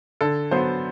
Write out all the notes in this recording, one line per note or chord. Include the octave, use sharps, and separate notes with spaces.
D3 A4
F#3 B3 C5